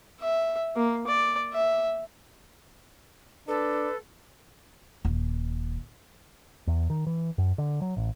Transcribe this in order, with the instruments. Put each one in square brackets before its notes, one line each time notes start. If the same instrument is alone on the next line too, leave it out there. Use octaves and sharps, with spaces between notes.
[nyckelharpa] E5
A#3
D5
E5
[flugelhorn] D4 [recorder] A4 [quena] B4
[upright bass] D#1
[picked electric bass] E2
D#3
E3
F#2
D3
F#3
A1